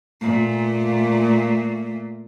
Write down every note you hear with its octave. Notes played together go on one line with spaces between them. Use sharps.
A#2 A3